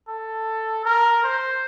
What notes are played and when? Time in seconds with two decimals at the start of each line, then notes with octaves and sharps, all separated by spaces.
0.08 A4
0.85 A#4
1.24 C5